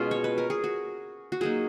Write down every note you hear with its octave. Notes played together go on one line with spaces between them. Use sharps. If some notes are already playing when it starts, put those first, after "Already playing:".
Already playing: B2 G#3 C#4 F4 G#4
C#5
B4
A#4
G#4
F#4
F#4
F#3 A#3 D#4 G#4